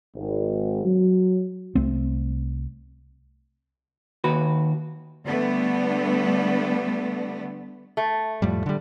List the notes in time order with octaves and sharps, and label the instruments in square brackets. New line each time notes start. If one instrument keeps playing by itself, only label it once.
[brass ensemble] G#1
F#3
[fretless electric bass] C2 A3 C4
[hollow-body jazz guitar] D#2 F#4 B4
[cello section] D3 G3 A3 B3 D4
[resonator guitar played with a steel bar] A3
[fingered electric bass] F2 A2 G3
D3 G3